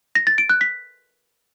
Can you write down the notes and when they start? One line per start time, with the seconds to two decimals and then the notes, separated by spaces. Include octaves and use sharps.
0.15 A#6
0.27 A6
0.38 D7
0.50 F#6
0.61 B6